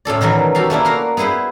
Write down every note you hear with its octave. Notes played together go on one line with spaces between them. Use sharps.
A2 C#4 A4 D5
B2 D#3 E3 F#3 A3
F#4 G4 A4 F5
A3 A#3 D4 E4
F#4 A#4 F5 A#5
B3 E4 G#4 B4 C5